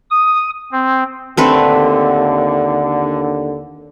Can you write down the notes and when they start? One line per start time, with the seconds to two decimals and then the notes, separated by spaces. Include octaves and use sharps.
0.11 D#6
0.72 C4
1.37 D#2 D3 A3 C4 B4